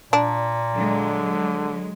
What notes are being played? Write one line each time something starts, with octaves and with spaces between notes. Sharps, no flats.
A#2 D4
D3 F#3 G#3